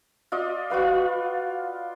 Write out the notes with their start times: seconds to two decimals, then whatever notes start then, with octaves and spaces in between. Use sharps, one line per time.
0.32 F4 D5 D#5
0.70 F4 F#4 B4 F5